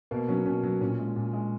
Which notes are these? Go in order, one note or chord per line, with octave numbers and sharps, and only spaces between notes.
B2 A#3
F#3 C#4
B2 C#4
F#3
A#2 C#4
G#3
A#2
G#3